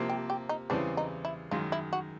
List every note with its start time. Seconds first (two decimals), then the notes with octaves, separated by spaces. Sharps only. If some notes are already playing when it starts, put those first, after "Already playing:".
Already playing: C3 F3 A#3
0.09 G4
0.30 G4
0.49 D#4
0.70 E2 C#3 E3 G3 C4 D4
0.97 D#4
1.25 E4
1.51 F#2 D#3 G#3 F4
1.72 E4
1.93 F#4